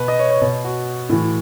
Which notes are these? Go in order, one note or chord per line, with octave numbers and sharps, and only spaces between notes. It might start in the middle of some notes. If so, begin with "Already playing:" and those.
Already playing: B2 B4
D#5
C#5
C#5
B2
F#4
A2 E3